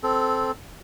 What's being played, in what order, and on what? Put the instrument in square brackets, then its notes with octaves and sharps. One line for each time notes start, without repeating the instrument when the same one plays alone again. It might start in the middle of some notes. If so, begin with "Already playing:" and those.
[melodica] C4 A4